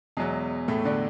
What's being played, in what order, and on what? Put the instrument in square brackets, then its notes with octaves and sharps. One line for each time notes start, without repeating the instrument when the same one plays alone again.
[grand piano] E2 B2 F#3 G#3
A2 A3
D3 D4